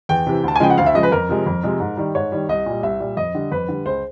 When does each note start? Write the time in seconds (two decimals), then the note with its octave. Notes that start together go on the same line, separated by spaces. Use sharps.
0.09 E2 G5
0.26 C3 E3
0.44 D2 A5
0.56 G#5
0.60 C#3 F3 G#3 G5
0.70 F#5
0.78 D2 F5
0.86 E5
0.94 C#3 F3 G#3 D#5
1.03 B4
1.12 F2 A#4
1.29 C3 F3 G#3
1.46 F2
1.63 C3 F3 G#3
1.80 G#2
1.97 D#3 G3
2.15 G#2 C#5
2.32 D#3 G3
2.49 C2 D#5
2.66 A#2 G3
2.83 C2 E5
3.00 A#2 G3
3.17 F2 D#5
3.35 D3 G3
3.52 F2 B4
3.68 D3 G3
3.86 C#2 C5